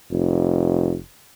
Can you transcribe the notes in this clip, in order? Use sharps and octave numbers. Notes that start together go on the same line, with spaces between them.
F1